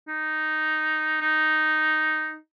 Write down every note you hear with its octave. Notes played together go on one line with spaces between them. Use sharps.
D#4
D#4